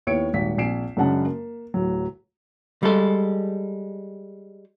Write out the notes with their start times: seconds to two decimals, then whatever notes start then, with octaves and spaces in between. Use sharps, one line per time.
0.07 D#2 B3 E4 C#5 C#7 D7
0.33 D#1 G#1 B6
0.58 A#1 C4 G#5 C7 D7 E7
0.97 F#2 C#3 G#3 D4 F#5 A5
1.26 A#3
1.74 D1 F#3
2.83 G3 G#3 A4